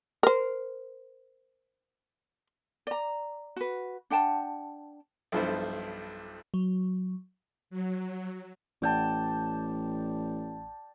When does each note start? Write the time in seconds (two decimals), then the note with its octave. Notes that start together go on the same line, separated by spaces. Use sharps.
0.23 A#4 C5
2.87 D5 A#5
3.56 F#4 B4
4.10 D4 F#5 G5 A5
5.32 B1 G2 F3 E4 A4 C5
6.54 F#3
7.70 F#3
8.82 A1 D5 G5 A5